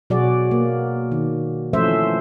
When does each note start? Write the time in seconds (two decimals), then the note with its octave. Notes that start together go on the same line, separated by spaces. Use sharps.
0.10 B2 F#3 F#4 G#4 D5
0.51 A#3
1.12 D#3
1.73 E3 F3 A3 C#4 C5 E5